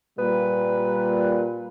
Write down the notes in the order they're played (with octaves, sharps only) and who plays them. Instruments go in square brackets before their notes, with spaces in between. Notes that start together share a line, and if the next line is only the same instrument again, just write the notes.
[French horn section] A#2 G3 [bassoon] B4